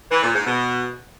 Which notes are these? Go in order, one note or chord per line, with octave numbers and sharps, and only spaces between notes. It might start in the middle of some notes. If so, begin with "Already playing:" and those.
E3
A#2
G#2
B2